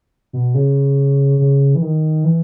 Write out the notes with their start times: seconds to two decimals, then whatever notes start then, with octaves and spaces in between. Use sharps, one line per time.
0.33 B2
0.55 C#3
1.39 C#3
1.75 E3
1.82 D#3
2.24 E3